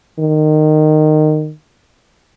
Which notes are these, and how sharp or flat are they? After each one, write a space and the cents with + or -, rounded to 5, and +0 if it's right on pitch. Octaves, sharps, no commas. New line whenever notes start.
D#3 -20